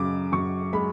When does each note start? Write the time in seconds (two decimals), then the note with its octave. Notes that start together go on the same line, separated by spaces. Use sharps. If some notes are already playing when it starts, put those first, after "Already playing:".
Already playing: F#2 C#3 D6
0.32 F#2 C#6
0.73 G#3 B5